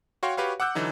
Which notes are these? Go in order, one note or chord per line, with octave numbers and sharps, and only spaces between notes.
F#4 C#5 F5 G5 C6 C#6
F#4 G4 B4 C#5 F5
F#5 D6 E6 F#6 G6
D3 E3 F#3 D#4